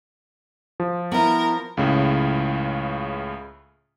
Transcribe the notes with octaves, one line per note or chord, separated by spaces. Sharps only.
F3
B3 E4 A#4
C#2 A2 C#3